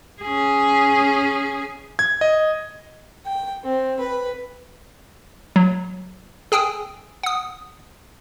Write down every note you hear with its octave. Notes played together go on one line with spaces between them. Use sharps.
C#4 G#4
G#6
D#5
G5
C4
B4
F#3
G#4 G5 G#5 D#6 E6
F#5 D#6